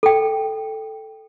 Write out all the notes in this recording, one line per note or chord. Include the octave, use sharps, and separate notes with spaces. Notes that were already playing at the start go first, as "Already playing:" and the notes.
A4 G5